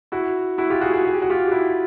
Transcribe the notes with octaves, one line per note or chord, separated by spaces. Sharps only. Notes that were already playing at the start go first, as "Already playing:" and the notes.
E4 F#4
E4 F#4
F4 G4
F#4 G#4
F#4 G#4
G#4
G4
F#4
F4 G4
G4
E4 F#4